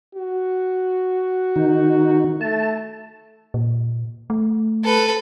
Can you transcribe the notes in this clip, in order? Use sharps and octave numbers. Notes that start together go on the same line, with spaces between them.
F#4
D#3 D#4
A3 A5
A#2
A3
A4 B4